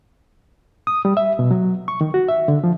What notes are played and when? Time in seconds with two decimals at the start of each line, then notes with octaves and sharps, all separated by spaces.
0.87 D#6
1.05 G3
1.17 E5
1.39 B2
1.51 F#3
1.88 C#6
2.01 D#3
2.14 F#4
2.29 E5
2.48 D3
2.64 F3